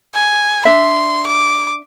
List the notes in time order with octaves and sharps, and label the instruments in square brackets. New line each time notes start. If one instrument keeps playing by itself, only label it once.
[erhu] G#5
[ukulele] D4 E5 [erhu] C6
[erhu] D6